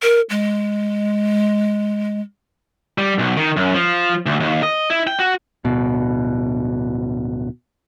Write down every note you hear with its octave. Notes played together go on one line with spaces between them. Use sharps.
A#4
G#3
G3
B1
D#3
F#2
F3
D2
D#2
D#5
E4
G5
F#4
D1 B2